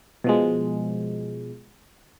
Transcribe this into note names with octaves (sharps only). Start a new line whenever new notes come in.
B2 F3 G#3